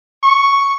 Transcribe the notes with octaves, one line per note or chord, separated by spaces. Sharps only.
C#6